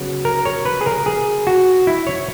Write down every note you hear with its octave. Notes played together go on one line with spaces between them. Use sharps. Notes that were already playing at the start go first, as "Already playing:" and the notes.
Already playing: C#3 F#3 B3
A#4
C#5
B4
G#4
A#4
G#4
F#4
E4
C#5